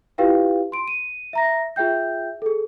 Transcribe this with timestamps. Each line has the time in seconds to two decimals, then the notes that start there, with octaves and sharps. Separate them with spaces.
0.18 E4 F4 G4 B4 F5 G5
0.72 C6 D7
0.88 D#7
1.33 E5 A#5 A#6
1.76 F4 G#4 E5 G5 G6
2.42 G#4 A4